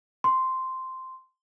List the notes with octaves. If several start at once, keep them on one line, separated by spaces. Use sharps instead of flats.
C6